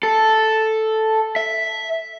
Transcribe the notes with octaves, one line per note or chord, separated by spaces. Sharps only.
A4
E5